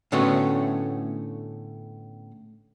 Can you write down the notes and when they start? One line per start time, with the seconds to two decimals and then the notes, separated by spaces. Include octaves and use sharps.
0.12 A2 D3 A3 B3 C#4 F#4